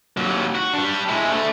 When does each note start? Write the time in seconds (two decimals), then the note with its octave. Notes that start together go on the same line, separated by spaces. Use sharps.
0.17 D#2 F#3
0.55 F#4
0.74 G3 D4
1.09 G#3 E4
1.31 A3 D4